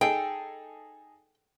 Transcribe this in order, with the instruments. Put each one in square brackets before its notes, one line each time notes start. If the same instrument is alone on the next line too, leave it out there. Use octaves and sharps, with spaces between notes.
[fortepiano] D#4 G#4 A4 [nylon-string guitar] G5